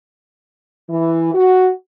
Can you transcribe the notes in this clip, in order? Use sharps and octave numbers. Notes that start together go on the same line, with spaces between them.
E3
F#4